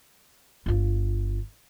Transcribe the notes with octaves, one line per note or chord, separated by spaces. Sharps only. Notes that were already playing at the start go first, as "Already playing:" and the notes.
G1 F4